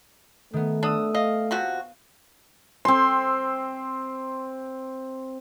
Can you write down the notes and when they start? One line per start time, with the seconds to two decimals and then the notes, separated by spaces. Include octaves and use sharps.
0.53 D#3 A3 B3
0.83 B3 D4 D#6 E6
1.14 D#5 F5
1.51 C3 F3 F#4
2.85 C4 C6